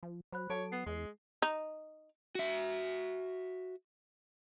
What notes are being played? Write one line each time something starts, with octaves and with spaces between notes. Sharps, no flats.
F3
F#3 C5 B5 F#6
F#3 A4 C#5 A5 D7
B3 C7
E2 G#3
D#4
F#4 E5